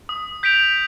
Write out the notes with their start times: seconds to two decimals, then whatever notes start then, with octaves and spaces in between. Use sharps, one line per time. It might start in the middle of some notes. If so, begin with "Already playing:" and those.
0.09 D#6
0.43 G6 B6 D7 F7